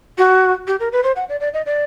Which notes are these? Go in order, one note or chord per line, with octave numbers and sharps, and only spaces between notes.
F#4
G4
A#4
B4
C5
F#5
D5
D5
D#5
D5